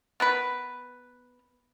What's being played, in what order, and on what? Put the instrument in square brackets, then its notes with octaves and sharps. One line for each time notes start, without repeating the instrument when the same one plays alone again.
[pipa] B3 A#4 B4